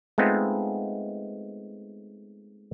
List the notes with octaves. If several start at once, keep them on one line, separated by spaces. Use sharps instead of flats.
G#3 A3 B3 C4 D#4 F4